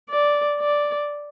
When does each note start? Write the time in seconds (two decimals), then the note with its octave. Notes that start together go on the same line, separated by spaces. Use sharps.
0.10 D5
0.60 D5